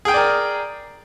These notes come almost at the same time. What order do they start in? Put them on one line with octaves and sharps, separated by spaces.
G#4 G5 G#5 D5 A#4